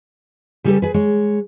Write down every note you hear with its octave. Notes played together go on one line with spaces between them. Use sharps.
C#3 G3 C#4 G4 A4 B4
G#4 B4
G#3 C#5